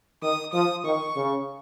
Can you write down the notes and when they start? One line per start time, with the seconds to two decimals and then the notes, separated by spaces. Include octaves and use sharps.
0.22 D#3 D#6
0.53 F3 D#6
0.84 D#3 C#6
1.16 C#3